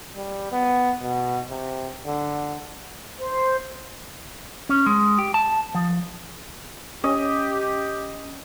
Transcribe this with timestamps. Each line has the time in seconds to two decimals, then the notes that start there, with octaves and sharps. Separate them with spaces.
0.16 G3
0.52 B3
1.03 B2
1.50 C3
2.07 D3
3.19 C5
4.69 C#4
4.86 G#3
5.19 G4
5.34 A5
5.75 F3
7.04 C#4 G4 D#5